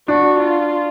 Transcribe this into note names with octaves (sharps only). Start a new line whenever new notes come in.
D4 F#4
F4